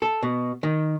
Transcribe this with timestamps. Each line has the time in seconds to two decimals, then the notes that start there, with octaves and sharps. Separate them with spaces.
0.02 A4
0.23 B2
0.63 D#3